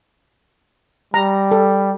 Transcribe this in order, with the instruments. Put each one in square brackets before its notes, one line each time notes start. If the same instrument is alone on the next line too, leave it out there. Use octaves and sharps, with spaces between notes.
[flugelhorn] G3 [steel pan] A#5
[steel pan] A4